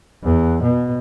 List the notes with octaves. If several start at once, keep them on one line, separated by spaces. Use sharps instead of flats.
E2
B2